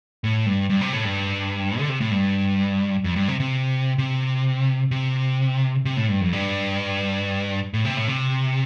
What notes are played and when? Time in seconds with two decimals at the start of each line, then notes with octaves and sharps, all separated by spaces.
0.24 A2
0.46 G2
0.70 G2
0.81 C3
0.93 A2
1.05 G2
1.79 D3
1.89 C3
2.00 A2
2.11 G2
3.04 F2
3.16 G2
3.28 C3
3.40 C3
3.98 C3
4.91 C3
5.85 C3
5.97 A2
6.09 G2
6.21 F2
6.33 G2
7.74 A2
7.85 C3
7.97 A2
8.07 C3